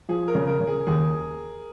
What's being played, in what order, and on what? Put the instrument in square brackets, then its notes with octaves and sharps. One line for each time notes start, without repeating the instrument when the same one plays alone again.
[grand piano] F3 [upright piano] G#4
[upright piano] A#4
[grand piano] C#3
[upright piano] A#4
[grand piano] C#3
[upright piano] G#4
[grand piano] D#2 [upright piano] G#4